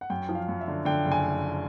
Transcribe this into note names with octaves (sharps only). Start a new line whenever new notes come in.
F#5
F#2 G5
F3
F5
F#2
E5
D3
D3 G5
F#1
G#5